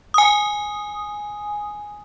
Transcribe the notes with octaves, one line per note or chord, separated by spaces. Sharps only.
G#5 D#6